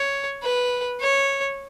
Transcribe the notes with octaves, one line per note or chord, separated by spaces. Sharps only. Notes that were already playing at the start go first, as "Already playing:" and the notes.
Already playing: C#5
B4
C#5